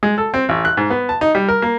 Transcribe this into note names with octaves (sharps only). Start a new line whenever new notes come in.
G#3
A4
C4
A1
F#6
G#2
B3
A5
D#4
G3
A#4
A#3